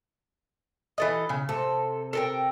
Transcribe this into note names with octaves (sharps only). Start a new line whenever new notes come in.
E3 A4 D#5
C#3
C3 A4
A4 A#4 G5